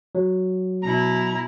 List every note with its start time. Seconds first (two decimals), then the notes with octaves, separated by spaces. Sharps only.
0.15 F#3
0.83 B2 E4 A#5